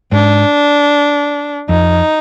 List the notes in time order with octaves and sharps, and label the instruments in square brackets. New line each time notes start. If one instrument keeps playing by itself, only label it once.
[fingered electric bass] G#2 [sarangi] D4
[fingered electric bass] F2 [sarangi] D#4